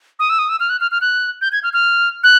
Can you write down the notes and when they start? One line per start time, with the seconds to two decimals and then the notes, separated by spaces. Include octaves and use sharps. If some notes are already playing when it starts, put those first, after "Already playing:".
0.19 D#6
0.30 E6
0.39 D#6
0.49 E6
0.60 F6
0.70 F#6
0.81 F6
0.91 F6
1.01 F#6
1.41 G6
1.52 G#6
1.63 F6
1.73 F6
2.24 F#6